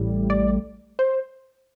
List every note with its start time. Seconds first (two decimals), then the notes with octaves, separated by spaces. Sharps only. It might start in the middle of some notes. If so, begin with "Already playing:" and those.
Already playing: A1 A2 G3
0.30 D5
0.99 C5